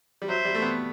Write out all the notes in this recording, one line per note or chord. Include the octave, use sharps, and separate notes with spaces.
G3
F#3 C5 E5
G3
A3
B3